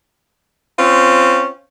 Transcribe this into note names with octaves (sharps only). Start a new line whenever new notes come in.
C4 C#4 F4